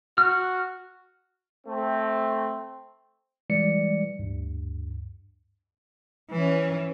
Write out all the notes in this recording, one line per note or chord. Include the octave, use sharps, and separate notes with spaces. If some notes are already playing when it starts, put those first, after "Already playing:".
F#4 F6
A3 C4
E3 G3 G#3 D5 C#7
D2 G2
E3 C#4